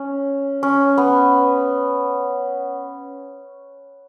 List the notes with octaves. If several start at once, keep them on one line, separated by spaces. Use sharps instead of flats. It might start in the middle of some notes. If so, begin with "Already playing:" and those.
Already playing: C#4
C#4
B3